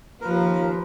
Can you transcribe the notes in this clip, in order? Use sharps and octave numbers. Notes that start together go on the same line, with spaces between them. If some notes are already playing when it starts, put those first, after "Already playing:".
D#2 F3 A#4 B4